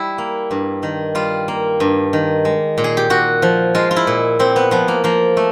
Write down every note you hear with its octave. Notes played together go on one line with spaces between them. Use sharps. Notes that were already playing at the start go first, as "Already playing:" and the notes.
Already playing: G3 E4
A#3
G2
D#3
G3 F4
A#3
G2
D#3
G#3
A#2
G#4
G4
A#2 F#4
F3
G#3 F4
F4
E4
A#2
A#2 C4
B3
F3 B3
A#3
F3 A#3
A3